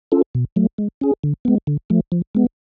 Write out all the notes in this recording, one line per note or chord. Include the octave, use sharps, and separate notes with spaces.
C#4 F4 A4
B2
F#3 A3
G#3
C#4 G#4
D3
G#3 B3
D3
F3 A3
F3
G#3 B3